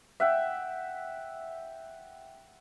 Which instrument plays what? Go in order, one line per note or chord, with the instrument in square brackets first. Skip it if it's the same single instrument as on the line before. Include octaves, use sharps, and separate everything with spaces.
[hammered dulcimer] E5 F#5 G5